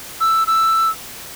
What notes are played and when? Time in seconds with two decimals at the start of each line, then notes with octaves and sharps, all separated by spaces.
0.21 E6
0.47 E6